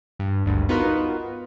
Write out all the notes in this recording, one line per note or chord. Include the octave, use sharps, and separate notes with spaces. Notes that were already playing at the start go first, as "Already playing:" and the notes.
G2
G#1 D2 G2
B3 D#4 F4 F#4 A#4 B4